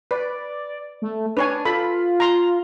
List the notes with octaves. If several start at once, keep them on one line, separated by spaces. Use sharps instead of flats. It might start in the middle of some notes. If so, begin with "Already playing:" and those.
B4 D5
A3
D4 B4 C#5 G#5
F4 A4 B5
A#5 C6